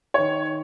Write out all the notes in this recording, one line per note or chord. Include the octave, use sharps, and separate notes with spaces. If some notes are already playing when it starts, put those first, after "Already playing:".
D#3 C#5